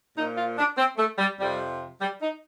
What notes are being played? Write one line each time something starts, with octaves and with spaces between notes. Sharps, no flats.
A#2 F3 D#4
F4
D4
C4
A3
G3
F2 C3 F3 G3
G3
D#4